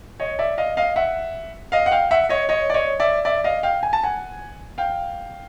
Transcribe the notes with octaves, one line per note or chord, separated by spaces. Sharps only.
C#5 D#5
D5 E5
D#5 F5
D#5 F5
E5 F#5
D#5 F5
F#5
F5 G5
E5 F#5
C#5 D#5
C#5 D#5
D5
C#5 D#5
D5 E5
D5 E5
D#5 F5
F5 G5
G#5
A5
F#5 G#5
F5 G5